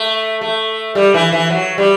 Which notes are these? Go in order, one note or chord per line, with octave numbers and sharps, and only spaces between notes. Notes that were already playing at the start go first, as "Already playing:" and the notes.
Already playing: A3
A3
G3
E3
E3
F#3
G3